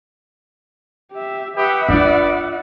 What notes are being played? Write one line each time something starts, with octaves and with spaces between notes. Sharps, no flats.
G4 E5
G4 B4 E5 F#5 B5 D#6
D4 F4 D5